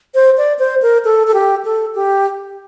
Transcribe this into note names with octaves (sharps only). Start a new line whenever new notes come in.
C5
D5
C5
A#4
A4
A4
G4
A4
G4